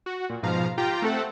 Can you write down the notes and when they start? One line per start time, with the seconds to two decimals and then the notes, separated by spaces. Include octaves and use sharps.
0.06 F#4
0.29 A#2
0.43 G#2 B2 F3 F5 A#5
0.78 F4 G4 G5 A#5
1.02 A3 C4 A4 F#5